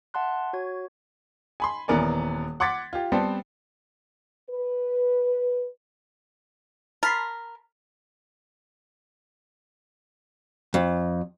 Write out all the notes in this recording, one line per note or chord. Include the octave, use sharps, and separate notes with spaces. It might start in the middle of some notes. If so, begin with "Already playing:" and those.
E5 F#5 A5 C6 F#6
F#4 C#5 G#6
G#5 B5 C6
D#1 E3 B3 A#4 D5 G#5
F#5 C6 D6 G#6 A6 B6
F4 G4
G3 B3 C4 C5 G5 A5
B4
A#4 A5 B5 C6
F2